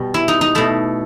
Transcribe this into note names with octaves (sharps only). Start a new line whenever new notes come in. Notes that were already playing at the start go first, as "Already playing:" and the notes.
Already playing: B2 G3
E4
D#4
D#4
B2 A3 E4